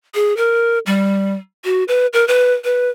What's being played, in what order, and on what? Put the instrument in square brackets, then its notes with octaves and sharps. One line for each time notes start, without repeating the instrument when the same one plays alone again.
[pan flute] G#4
A#4
G3
F#4
B4
A#4
B4
B4